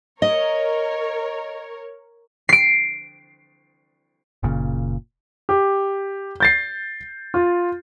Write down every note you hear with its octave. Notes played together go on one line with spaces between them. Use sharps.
A#4 C#5 D#5
C7 D7
F#1 A#2 C#3
G4
G6 A6 C7
F4